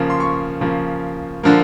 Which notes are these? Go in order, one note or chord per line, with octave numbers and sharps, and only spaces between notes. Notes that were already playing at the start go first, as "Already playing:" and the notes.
Already playing: C#3 F3 A#3
C6
C#6
C#3 F3 A#3
D3 F3 A#3